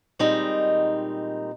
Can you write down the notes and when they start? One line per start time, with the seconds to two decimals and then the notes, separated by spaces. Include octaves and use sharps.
0.19 A#2 D#3 G3 G#3 C4 D#4